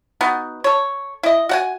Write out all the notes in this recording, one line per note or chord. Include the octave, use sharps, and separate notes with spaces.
B3 D#4 F#4
A4 C#5
E4 D#5
F#4 F#5 G#5